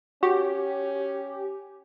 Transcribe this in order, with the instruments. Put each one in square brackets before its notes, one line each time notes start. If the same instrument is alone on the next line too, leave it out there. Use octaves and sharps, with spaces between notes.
[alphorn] C#4 [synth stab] F#4 [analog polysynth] G4